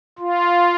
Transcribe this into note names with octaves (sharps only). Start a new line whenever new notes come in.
F4